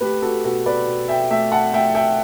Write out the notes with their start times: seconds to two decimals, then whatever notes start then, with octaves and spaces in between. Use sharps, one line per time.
0.01 A3 G4 B4
0.22 F#4 A4
0.44 B2 F#4 A4
0.66 B4 D5
0.87 B2
1.08 E5 G5
1.30 A3 E5 G5
1.52 F#5 A5
1.73 A3 E5 G5
1.95 E5 G5